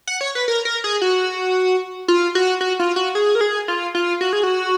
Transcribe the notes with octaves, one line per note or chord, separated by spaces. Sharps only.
F#5
C#5
B4
A#4
A#4
G#4
F#4
F4
F#4
F#4
F4
F#4
G#4
A#4
G#4
F4
F4
F#4
G#4
F#4